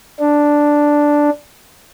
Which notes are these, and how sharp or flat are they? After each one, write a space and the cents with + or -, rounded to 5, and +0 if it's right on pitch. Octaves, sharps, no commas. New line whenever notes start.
D4 +0